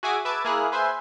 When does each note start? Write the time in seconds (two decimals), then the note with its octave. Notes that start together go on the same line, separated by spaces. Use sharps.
0.03 F#4 G#4 E5 G#5 D6 D#6
0.25 B4 E5 A5 D6 G#6
0.45 A#3 E4 G#4 F6 F#6
0.72 B4 C5 E5 G#5 C6